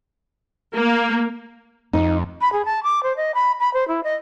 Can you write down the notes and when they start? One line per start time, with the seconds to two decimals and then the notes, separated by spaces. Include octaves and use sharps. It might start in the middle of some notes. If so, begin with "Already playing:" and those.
0.75 A#3
1.93 F2 D#4
2.41 B5
2.53 G#4
2.65 A5
2.83 D6
3.03 C5
3.17 D#5
3.35 B5
3.60 B5
3.74 C5
3.88 E4
4.04 D#5